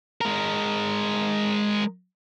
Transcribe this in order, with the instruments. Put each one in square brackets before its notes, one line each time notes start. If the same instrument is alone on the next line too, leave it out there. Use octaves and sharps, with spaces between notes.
[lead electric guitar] G#3 A#4